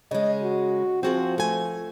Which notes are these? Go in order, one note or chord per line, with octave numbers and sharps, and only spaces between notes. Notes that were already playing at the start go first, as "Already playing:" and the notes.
C#3 G#3 D#5
F#4
F3 C4 F#4 G#4
A3 G#5